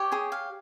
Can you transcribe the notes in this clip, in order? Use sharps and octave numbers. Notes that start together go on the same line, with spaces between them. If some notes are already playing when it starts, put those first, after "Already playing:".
Already playing: G4 C#5
G#4 G#5
F5